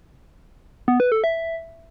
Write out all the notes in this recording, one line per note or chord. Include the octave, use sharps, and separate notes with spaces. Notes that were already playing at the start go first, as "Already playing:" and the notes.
B3
B4
A4
E5